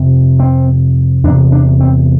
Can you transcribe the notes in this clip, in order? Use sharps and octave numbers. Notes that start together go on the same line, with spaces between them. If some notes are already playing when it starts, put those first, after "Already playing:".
Already playing: F2 C3
C4
E2 D4
C3
D4
C4